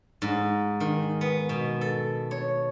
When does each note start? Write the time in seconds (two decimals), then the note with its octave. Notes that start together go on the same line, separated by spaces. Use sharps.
0.22 G#2
0.80 D#3
1.21 B3
1.49 B2
1.81 A4
2.31 C#5